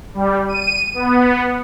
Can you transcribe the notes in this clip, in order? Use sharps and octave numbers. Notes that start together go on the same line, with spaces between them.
G3
D#7
B3